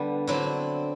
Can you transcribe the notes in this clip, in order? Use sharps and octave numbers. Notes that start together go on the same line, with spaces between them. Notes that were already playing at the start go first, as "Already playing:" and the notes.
Already playing: D3 G3 B3
D3 F#3 C4 E4